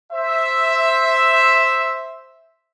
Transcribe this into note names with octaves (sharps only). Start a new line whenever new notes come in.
C5 E5